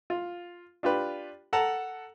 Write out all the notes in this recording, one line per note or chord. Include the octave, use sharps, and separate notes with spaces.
F4
D4 F4 G4 B4
A4 F#5 A5 A#5